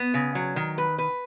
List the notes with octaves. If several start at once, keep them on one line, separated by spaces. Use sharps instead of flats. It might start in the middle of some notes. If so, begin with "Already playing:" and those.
Already playing: B3
C#3
F#3
D#3
B4
B4